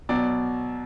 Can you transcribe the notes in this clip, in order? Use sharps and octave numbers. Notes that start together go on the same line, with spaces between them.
B2 F#3 D5